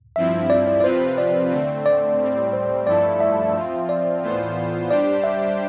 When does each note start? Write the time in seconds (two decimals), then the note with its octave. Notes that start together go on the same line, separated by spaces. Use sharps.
0.16 G2 F3 C4 E4 E5
0.50 D5
0.67 D5
0.80 D5
0.84 C3 F3 C4 F4 B4 C5
1.18 D5
1.51 D3 A3 C4
1.86 D5
2.20 A2 G3 C4
2.53 C5
2.87 G2 F3 A3 E4 A4 D5
3.20 E5
3.55 F3 C4 F4
3.89 D5
4.22 A2 E3 B3 F4 C5
4.90 G3 D4 G4 C5 D5
5.24 E5